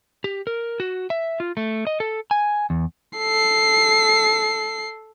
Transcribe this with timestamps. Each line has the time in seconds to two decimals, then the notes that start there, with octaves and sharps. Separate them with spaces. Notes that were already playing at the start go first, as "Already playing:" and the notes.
0.24 G4
0.47 A#4
0.80 F#4
1.10 E5
1.40 F4
1.57 A3
1.87 D#5
2.00 A4
2.31 G#5
2.70 E2
3.18 A4 C7